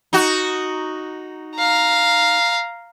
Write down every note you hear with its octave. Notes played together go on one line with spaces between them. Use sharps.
D#4 F#4
F5 A#5